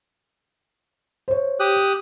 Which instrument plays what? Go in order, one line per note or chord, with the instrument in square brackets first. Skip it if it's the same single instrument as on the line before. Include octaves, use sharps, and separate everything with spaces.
[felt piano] C5 C#5
[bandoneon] G4 D#6 F#6